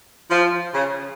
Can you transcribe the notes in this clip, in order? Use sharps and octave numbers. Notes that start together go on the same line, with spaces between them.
F3
C#3